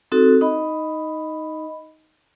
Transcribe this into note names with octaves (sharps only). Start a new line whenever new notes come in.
C4 D#4 F#4 A4
D#4 D#5 B5